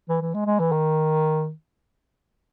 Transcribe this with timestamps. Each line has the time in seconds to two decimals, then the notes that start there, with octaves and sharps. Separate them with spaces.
0.09 E3
0.21 E3
0.34 G#3
0.46 G#3
0.59 E3
0.72 D#3